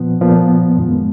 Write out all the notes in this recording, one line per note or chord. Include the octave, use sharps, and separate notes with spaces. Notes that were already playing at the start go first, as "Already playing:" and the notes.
Already playing: A#2 F3 B3
A#2 F3 B3
F#2 D#3 G#3 B3